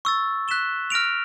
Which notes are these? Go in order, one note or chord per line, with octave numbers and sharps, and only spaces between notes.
C#6 E6 A6
F#6 B6 E7 G7
F6 A#6 D7 F7